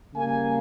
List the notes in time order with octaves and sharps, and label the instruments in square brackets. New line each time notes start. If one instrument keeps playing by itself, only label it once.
[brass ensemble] C#3 G3 A#3 G#5